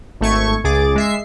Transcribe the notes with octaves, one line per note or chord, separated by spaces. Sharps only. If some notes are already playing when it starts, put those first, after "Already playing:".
G#1 A3 C#6 G#6
C#2 G#4 D6 A6
G#3 E5 C7